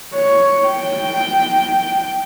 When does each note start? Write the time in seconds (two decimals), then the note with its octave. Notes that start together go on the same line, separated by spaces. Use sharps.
0.14 C#5
0.68 G5